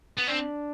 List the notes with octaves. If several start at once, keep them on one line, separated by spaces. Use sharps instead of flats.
B3
C4 D4